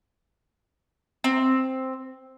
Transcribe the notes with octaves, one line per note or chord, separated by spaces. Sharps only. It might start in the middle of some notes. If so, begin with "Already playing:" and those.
C4